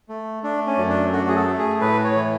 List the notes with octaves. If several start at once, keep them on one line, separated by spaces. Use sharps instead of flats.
A3
A3 D4
C#4
F#2
D4
A3 F#4
G#4
A4
A3
G#4
A2 B4
C#5
E3